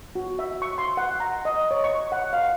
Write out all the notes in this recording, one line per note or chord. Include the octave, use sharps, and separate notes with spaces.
F#4
E5
C#6
C6
F#5
A#5
D#5
C#5
C#6
F#5
F5